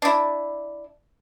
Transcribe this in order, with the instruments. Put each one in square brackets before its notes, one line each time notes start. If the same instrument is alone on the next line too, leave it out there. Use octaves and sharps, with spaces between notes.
[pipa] D4 E4